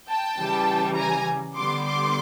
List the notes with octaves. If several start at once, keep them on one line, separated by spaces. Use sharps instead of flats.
G5 A5
C#3 E3 G3
G#5 A#5
D3 G3 B3 C6 D6
C6 D6